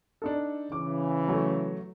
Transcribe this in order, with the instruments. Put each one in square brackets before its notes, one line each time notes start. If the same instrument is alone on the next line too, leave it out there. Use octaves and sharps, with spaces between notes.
[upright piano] D4 D#4 A4
[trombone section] C#3 E3 [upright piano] D6
[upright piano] F#3 A3